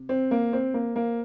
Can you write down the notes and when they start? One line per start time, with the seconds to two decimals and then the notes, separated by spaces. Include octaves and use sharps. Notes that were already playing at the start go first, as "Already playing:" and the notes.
Already playing: C3
0.09 C4
0.31 A#3
0.53 C4
0.74 A#3
0.96 A#3